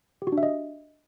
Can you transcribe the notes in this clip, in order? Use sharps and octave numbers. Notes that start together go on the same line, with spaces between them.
G4
F#4
D4
E5
D#5